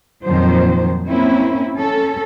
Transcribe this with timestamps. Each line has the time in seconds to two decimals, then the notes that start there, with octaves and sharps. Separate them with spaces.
0.25 F2 A#2 D#3 F3 F#3 C5
1.07 A#3 C4 C#4 E4
1.77 C#4 A4